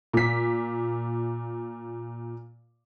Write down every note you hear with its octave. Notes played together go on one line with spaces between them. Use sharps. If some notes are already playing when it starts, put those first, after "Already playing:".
A#2 B6